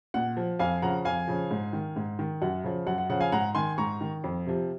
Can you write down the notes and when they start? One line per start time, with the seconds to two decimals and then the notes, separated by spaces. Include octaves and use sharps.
0.14 A#2 F#5
0.37 F3
0.59 F2 F5 G#5
0.82 C#3 F3 F#5 A#5
1.05 F2 F5 G#5
1.28 C#3 F3
1.51 G#2
1.73 D#3
1.96 G#2
2.19 D#3
2.42 F#2 F#5
2.64 C#3 F3
2.87 F#2 F#5
2.98 F#5
3.09 C#3 F3 F#5
3.21 F5 G#5
3.32 G#2 F#5 A#5
3.55 D#3 G#5 C6
3.78 G#2 A#5 C#6
4.01 D#3
4.24 F2
4.46 C3 F3